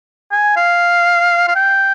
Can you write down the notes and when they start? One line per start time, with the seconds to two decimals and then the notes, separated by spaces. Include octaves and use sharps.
0.32 G#5
0.56 F5
1.48 F5
1.56 G5